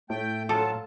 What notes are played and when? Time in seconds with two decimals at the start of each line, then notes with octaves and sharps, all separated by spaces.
0.10 A2 A3 G5 G6
0.49 F#3 F4 A4 A5